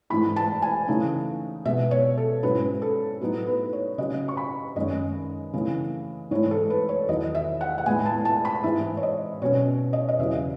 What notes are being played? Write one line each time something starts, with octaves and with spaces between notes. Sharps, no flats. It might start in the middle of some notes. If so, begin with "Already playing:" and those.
G#2 E3 A3 E4 B5
A5
G#5
C#3 E3 A3 D#4
B2 G#3 B3 E5
C#5
A4
G#2 F#3 C#4 E4 B4
A4
A2 F#3 B3 D#4
B4
C#5
C#3 F#3 C#4 D#5
C#6
B5
F#2 D#3 G#3 C#4 D#5
C#3 E3 A3 E4
G#2 E3 A3 E4 C#5
A4
B4
C#5
E2 D#3 F#3 D#5
E5
F#5
F#5
A2 G#3 B3 E4 G#5
A5
A5
B5
G#2 E3 G#3 E5
C#5
D#5
B2 F#3 C#4 C#5
D#5
D#5
E2 C#3 F#3 E5